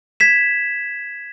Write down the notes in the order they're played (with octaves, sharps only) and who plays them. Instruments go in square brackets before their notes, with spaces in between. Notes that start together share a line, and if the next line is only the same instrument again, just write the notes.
[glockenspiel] G#6 B6 E7